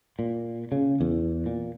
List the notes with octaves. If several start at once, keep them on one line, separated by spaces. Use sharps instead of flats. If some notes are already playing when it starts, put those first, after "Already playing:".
A#2
C#3
E2
A#2